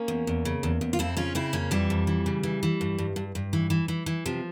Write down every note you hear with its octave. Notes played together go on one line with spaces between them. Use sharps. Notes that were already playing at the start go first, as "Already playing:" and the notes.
Already playing: A#3 C#4
E2
E2
C#3
E2
E2
F4
F2 C4 E4
C#3 C#4 F4
C#3 C4 E4
F2 A#3 C#4
F2 E3 G3
F2
E3
C#3
E3
E3
G2
G2
G2
G2
E3
E3
E3
E3
C3 F3